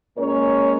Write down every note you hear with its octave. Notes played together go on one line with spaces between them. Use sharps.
A#2 G#3 C#4 A#4 C#5